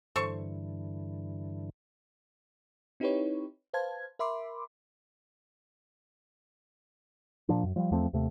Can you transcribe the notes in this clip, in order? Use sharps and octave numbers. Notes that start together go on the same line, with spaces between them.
G2 D3 E3 A4 C5 C#6
C4 D#4 E4 G4 B4 C#5
B4 C5 F5 A5 G#6
A#4 E5 B5 C6 D6
A#2 F3 D4
F#2
F3 G3
E2 F3 A3 C4
D#2 C3 A3